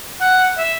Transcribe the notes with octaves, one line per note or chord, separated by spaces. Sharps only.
F#5
E5